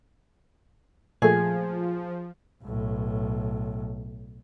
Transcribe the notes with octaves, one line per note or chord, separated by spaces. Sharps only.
A#2 F3 A3 G#4
B1 A2